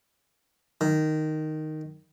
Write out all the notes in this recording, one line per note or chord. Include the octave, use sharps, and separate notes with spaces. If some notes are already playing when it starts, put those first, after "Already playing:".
D#3